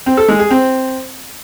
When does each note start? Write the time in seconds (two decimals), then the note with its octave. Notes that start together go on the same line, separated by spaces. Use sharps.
0.06 C4
0.17 A4
0.28 G#3
0.39 G#4
0.50 C4